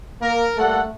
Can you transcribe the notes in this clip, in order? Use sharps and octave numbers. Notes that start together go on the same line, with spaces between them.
A#3 A#4
G3 A3 A#3 A4 F#5